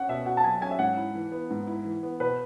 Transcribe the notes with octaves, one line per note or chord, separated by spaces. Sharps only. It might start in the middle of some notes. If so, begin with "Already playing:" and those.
Already playing: C#4 F#5
B2 E5
F#4 F#5
A5
F#3 G#5
C#4 G#5
E5
G#2 F#5
E4
E3
B3
G#2
E4
E3
B3
B2 B4